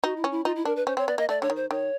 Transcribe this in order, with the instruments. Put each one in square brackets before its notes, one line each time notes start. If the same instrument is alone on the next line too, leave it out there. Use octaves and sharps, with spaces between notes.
[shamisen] D#4 [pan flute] F#4
[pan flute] E4
[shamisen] C#4
[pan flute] E4
[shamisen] D#4 [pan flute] F4
[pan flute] E4
[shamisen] D4 [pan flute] A#4
[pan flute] B4
[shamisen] C#4 [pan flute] C5
[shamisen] C4 [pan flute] C#5
[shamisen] B3 [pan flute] D5
[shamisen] A#3 [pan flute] D#5
[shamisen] A3 [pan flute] D5
[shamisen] D3 [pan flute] C#5
[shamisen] D#3
[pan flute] C5
[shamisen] D#3 [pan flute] C#5